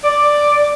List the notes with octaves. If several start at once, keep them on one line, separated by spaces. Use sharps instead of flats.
D5